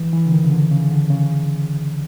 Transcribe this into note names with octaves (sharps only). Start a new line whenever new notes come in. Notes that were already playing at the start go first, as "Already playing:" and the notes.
Already playing: E3
E3
D3
D#3
C#3
D3
C#3
D3
C#3